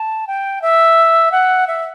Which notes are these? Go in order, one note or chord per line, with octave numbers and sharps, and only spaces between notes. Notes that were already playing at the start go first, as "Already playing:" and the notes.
Already playing: A5
G5
E5
F#5
E5